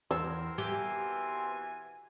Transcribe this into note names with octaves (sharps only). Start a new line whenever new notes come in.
E2 C4 A#4 C5 E6
B2 E3 G4 G#5